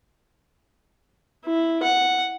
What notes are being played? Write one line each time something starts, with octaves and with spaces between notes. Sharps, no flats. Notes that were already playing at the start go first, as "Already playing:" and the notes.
E4
F#5